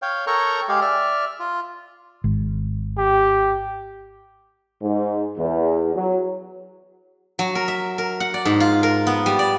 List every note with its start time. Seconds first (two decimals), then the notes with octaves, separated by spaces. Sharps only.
0.02 C#5 F5 G5
0.27 A4 A#4 C#5 G5 A#5 C#6
0.69 G#3 G4 G#4 F5
0.81 D5 E5 F6
1.40 F4
2.24 G#1
2.97 G4
4.80 G#2
5.38 E2
5.95 F#3
7.39 F#3
7.55 A#4
7.68 E5
7.98 A#4
8.20 F#5
8.34 D5
8.45 G#2
8.60 F4
8.83 A#4
9.07 B3
9.26 G3
9.39 D5